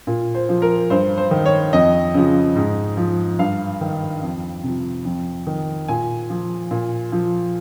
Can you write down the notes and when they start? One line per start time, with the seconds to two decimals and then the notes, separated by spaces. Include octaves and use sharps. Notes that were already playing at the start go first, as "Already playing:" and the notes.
0.07 A#2
0.35 C5
0.49 F3
0.62 A#4
0.90 G2 C5
1.17 C5
1.31 D#3
1.46 C#5
1.73 F2 D#5
2.14 C#3 F3
2.56 G#2
2.97 F3
3.39 G2 F5
3.81 D#3
4.23 F2
4.63 C3 F3
5.05 F2
5.47 D#3
5.88 A#2 G#5
6.30 F3
6.71 A#2
7.12 F3